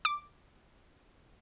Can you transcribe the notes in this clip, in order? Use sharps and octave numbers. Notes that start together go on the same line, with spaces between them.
D6